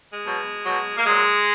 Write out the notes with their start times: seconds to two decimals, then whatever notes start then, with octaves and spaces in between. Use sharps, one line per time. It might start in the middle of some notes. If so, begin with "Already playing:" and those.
0.13 G#3
0.24 B2 F#3
0.66 B2 F#3
0.97 A#3
1.06 A#2 F#3 G#3